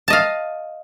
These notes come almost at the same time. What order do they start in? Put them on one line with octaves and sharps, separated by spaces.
A5 D#5 F5